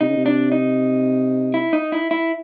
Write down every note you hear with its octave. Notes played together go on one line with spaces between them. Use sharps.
C3 D#4
C#3
C3
D4
D#4
E4
D#4
E4
E4